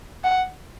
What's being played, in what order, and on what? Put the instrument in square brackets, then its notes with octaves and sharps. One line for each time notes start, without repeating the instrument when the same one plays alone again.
[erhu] F#5